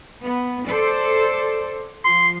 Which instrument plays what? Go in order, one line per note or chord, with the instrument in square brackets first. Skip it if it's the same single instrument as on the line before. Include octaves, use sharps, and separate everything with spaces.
[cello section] B3
A4 C5 D5
[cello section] F3 [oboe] C6